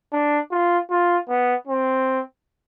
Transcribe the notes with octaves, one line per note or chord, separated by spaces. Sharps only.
D4
F4
F4
B3
C4